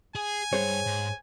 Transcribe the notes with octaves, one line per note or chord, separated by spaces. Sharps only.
G#4 G#5
G2 G#4 C5 C#5
G#2